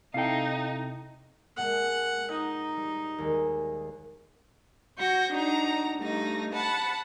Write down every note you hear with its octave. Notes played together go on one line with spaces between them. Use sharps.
C3 D#4 E4 A4 F5 G5
A#2 G#3 F#5 A5
D#4 A#5 D#6
G3
D#2 G3 G#3
F#4 C#6 G6 A#6
D4 D#4 F#4 A#5
G2 A3 D#4 A#6
F#5 A5 B5